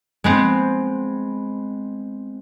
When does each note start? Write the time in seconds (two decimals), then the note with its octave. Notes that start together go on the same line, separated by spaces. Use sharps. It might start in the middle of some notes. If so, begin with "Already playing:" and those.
0.24 G#3 B3 C4